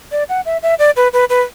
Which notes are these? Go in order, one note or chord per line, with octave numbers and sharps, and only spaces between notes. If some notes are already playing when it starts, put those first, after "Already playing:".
D5
F#5
E5
E5
D5
B4
B4
B4